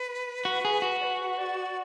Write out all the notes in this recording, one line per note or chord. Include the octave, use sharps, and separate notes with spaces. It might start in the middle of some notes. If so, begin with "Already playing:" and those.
Already playing: B4
F#4
G#4
F#4
D5
B4
D5